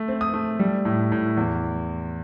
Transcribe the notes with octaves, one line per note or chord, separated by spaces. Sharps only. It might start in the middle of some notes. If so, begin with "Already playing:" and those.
Already playing: A3
C4
D#6
A3
G3
A2
A2
E2